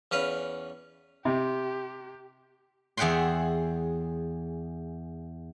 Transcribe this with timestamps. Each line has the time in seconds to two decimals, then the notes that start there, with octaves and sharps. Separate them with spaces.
0.11 E2 C#4 B4 F5
1.25 C3 G4
2.97 E2 G#4 E5 F#5 G5 C6